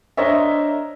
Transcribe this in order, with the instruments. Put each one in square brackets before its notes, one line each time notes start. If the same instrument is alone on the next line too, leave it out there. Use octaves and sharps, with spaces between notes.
[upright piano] D4 A#4 C5 C#5 D#5 E5